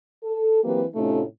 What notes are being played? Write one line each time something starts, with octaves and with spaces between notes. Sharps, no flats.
A4
E3 F#3 A#3 C4 G4 B4
A2 C3 A3 C#4 D#4 F4